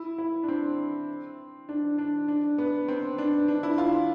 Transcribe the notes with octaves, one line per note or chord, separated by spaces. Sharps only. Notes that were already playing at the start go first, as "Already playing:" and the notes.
Already playing: E4
E4
D4
C4
D4
D4
D4
B3
C4
D4
D4
E4
F4